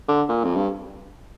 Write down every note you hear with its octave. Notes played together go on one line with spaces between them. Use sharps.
D3
A#2
F2
G2